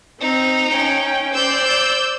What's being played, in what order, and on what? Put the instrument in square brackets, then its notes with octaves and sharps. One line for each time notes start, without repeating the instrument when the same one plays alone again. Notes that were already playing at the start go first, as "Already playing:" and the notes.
[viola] C4 [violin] D#4
[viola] C#4 G5
[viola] C5 D5 [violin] E6 G6